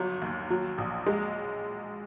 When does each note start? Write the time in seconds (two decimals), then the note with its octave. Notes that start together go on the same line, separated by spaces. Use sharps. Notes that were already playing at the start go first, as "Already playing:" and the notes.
Already playing: G1 F#3
0.22 D#2
0.50 F#3
0.78 A#1
1.06 G#3